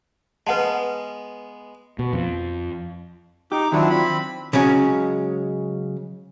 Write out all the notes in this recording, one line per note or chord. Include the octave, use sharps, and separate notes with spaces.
G#3 B3 B4 F#5 A5
B2
F2
D#4 G4 D6
D#3 F#3 C4 D4 E4 F4
C4 B5
C#3 F#3 G#3 C#4